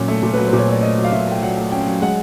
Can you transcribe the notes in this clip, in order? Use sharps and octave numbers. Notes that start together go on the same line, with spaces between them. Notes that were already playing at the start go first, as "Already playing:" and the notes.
Already playing: A#2 F#3 C#4
A3
A#2
F#3 B4
C5
A#2
C#5
A3 D5
A3 D#5
F#3
F5
A#2 E5
A3 G5
F#3 F#5
A3
C#4 G5
F#3
G#3 F#5